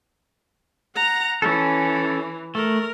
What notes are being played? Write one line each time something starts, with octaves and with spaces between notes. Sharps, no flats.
F#5 A#5
E3 C#4 A4
A3 A#4